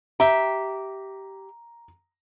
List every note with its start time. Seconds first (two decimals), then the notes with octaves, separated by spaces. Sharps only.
0.20 G4 E5 A#5